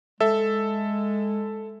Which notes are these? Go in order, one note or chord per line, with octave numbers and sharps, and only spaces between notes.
G#3 A4 E5